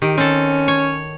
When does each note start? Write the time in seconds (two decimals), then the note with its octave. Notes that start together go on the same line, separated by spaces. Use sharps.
0.02 D#3 G4
0.18 C4 C#4 A4
0.68 C#5